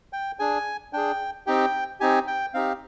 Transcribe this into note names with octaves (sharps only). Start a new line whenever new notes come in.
G5
D4 G#4 G#5
D4 G#4 G5
C4 D#4 G4 G5
C4 D#4 G4 G#5
G5
C4 D#4 G4 F5